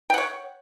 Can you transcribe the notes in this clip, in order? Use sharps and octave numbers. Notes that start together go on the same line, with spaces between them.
C#5 F#5 G5